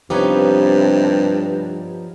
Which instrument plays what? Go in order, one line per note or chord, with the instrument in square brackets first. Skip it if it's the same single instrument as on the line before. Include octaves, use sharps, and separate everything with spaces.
[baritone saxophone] G2 [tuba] C3 [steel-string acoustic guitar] F3 B3 D#4 [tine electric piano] G4 B4 C#5